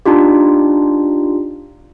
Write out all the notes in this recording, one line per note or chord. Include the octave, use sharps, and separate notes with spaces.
D4 D#4 F4 G4